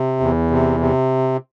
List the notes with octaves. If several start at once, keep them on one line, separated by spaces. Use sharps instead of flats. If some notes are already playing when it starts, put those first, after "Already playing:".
Already playing: C3
E2
C3
C3